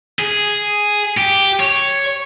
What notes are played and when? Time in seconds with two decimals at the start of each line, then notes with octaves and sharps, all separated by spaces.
0.19 G#4
1.17 G4
1.60 C#5